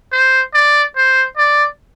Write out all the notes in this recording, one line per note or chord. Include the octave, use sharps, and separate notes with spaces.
C5
D5
C5
D5